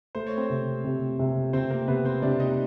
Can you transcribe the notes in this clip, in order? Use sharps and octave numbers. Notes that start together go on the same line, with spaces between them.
A3 C5
C#5
C4 C5
C3
C3
C3
C3 C4 C5
A#3 A#4
C3 B3 B4
C4 C5
C3 D4 D5
D#4 D#5